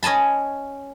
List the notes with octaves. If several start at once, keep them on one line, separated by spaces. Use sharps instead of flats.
C#4 D#5 G#5 A5 B5